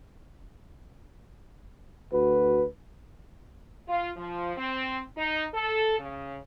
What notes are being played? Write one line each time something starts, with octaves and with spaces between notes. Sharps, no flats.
D2 F#4 B4
F4
F3
C4
D#4
A4
C#3